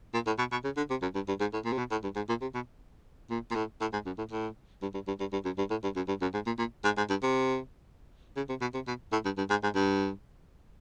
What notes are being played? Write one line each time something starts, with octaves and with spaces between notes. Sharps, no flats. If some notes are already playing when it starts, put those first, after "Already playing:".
A#2
A2
B2
B2
C#3
D3
C3
F#2
G2
G2
G#2
A2
A#2
C3
B2
A2
G2
G#2
A#2
C3
B2
A#2
A#2
A2
A2
G#2
F#2
A2
A2
G2
G2
G2
G2
G2
F#2
G2
A2
G2
F#2
G2
F#2
G#2
A#2
A#2
G#2
G#2
G2
C3
C#3
C3
B2
C3
B2
A2
G2
G2
G#2
G#2
G2